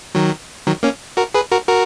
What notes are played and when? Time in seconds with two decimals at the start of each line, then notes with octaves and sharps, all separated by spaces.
0.15 D#3 F#3
0.67 D#3 F#3
0.83 A#3 C#4
1.17 F#4 A#4
1.34 G#4 B4
1.52 F#4 A#4
1.68 F#4 A#4